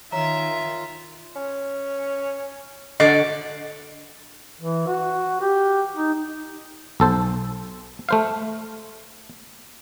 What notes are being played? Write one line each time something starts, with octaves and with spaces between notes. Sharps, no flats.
D#3 F4 C#5 E5 A#5
C#4
D3 F#4 D5 D#5
E3
F#4
G4
D#4
B1 A4 C5
A3 C5 F5